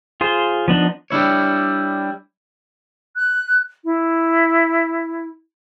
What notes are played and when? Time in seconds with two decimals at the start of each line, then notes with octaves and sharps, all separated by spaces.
0.21 F4 G#4 C5
0.68 F3 B3 D4 D#4
1.10 G3 D4 E4 C#5
3.16 F#6
3.84 E4